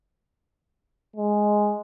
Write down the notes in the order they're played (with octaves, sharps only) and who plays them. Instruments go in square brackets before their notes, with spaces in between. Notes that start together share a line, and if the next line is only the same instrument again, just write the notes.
[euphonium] G#3